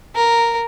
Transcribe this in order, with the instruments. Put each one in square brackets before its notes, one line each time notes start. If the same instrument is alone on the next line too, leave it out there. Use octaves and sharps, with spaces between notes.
[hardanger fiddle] A#4